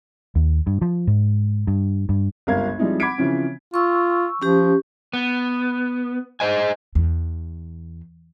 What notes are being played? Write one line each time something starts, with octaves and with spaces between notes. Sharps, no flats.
D#2
G2
F3
G#2
G2
G2
G1 C#2 A#4 F5 G#6
F3 G3 G#3 C4 D#4 E4
F#5 B5 D6 G#6 B6 D7
C#3 E3 F3 C4 C#4
F4 C#6 E6
F3 C#4 G4
B3
G#4 C5 D#5 G#5
E2